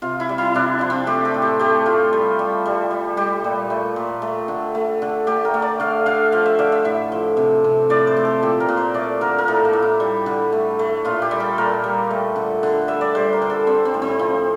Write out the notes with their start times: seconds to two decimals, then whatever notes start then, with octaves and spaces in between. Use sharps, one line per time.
0.02 C3 F4
0.20 E4
0.29 G3
0.38 E4
0.54 C3 D4
0.79 F3 D4
0.90 C4
1.07 A3 G4
1.25 A4
1.34 A2
1.42 G4
1.59 A3 G4
1.86 A3 F4
2.13 G3
2.39 G3
2.66 G3
2.91 G3
3.17 G3 G4
3.44 A#2
3.70 A3
3.96 A#2
4.22 A3
4.48 D3
4.75 A3
5.02 D3
5.27 A3 G4
5.45 A#4
5.54 A3
5.62 D5
5.80 D3 F5
6.06 D3 F5
6.32 F3 F5
6.46 E5
6.59 D3 D5
6.72 E5
6.85 A2 E5
7.12 F3
7.37 C3
7.64 C3
7.90 A2 D5
8.07 C5
8.17 A2
8.25 A4
8.42 A#2 G4
8.60 A#4
8.69 A#2
8.77 C5
8.94 A3 D5
9.21 D3 A#4
9.38 A#4
9.48 A2 A4
9.65 A#3
9.73 A2
9.82 E4
10.00 G3
10.26 D3
10.52 A3
10.79 A3
11.05 A#2 F4
11.22 G4
11.31 G3
11.40 A4
11.58 A#2 A#4
11.84 G3
12.11 A3
12.36 D3
12.63 D3
12.88 G3 E5
13.01 D5
13.15 G3 C5
13.33 A#4
13.42 D3
13.50 A4
13.67 G3 C4
13.85 C4
13.94 A2
14.02 C4
14.19 F3